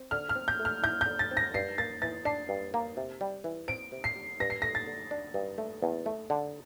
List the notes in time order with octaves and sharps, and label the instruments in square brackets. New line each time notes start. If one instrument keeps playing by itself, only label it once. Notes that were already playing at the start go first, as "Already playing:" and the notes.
Already playing: [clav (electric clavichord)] C4
[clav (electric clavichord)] D3 [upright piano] F6
[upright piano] F6
[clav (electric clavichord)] C4
[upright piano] G6
[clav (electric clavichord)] A3
[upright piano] F6
[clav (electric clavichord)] E4 [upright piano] G6
[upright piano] G6
[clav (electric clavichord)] D3
[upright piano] A6
[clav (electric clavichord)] C4
[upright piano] A#6
[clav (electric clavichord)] G2 [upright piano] C7
[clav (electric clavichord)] A#3 [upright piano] A6
[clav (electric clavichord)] E3 [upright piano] A6
[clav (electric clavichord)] D4 [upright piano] C7
[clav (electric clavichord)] G2
A#3
C3
G3
E3
[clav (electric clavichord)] C4 [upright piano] D7
[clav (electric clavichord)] C3
[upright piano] C7
[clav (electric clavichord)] G3
[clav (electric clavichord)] G2 [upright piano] A#6
[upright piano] C7
[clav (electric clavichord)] A3 [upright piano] A#6
[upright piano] A6
[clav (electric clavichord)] D3
D4
G2
A3
E2
A3
D3